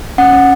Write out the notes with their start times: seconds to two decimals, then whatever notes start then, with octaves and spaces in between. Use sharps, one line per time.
0.18 C#4 F#5
0.33 C#4